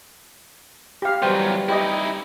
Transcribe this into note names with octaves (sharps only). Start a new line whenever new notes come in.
G4 F5
E2 F#3 G3 B4 C5 G5
D#4 E4 G4 D#5